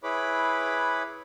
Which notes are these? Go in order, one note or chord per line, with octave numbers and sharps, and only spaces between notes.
E4 G#4 B4 C#5 B5 D6